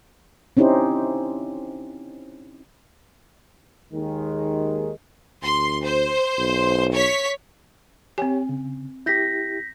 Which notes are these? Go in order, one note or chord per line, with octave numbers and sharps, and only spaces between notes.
C4 C#4 D#4 E4 G4 C5
D#2 D#3 G#3
D2 C6
C5
B1
C#5 B6
C4 G4 C#5 G#5
C#3
E4 G4 G6 A#6 B6